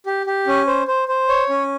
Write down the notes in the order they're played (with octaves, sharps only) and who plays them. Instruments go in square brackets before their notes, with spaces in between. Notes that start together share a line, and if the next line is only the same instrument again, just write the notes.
[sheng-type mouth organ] G4
G4
C#4
C5
C5
C5
C#5
C#4